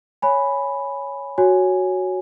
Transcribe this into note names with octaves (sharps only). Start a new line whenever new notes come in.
C#5 G#5 B5
F#4 C#5 G#5